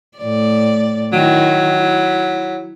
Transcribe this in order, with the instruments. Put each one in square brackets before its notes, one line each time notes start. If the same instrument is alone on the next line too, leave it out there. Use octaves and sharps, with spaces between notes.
[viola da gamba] A2 D5
[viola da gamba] D#3 E4 [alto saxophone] F#3
[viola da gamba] E4